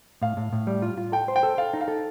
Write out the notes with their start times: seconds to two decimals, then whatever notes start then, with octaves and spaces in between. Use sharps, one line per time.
0.22 A2 F5
0.37 A2
0.53 A2
0.67 G3
0.82 F4
0.98 F4
1.12 A4 G5
1.28 C5
1.36 G5
1.43 A4
1.58 A4 F5
1.74 D#4
1.81 F5
1.88 A4